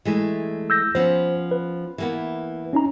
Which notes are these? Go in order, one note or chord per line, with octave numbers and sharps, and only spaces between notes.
E3 G#3 A3
E6 G6 A#6
F3 B3 C#4 C5
B4
E3 A#3 B3
C#4 D#4 A#5